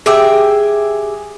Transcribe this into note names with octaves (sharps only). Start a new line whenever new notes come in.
G4 G#4 E5 G5